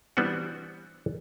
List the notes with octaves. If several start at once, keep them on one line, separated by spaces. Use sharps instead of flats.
E3 G3 B3 C4 D4 F#4